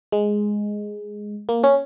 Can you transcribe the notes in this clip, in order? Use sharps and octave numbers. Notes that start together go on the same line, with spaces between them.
G#3
A#3
C#4